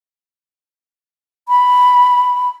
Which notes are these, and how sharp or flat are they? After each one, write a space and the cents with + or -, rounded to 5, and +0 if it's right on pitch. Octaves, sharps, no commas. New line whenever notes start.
B5 +0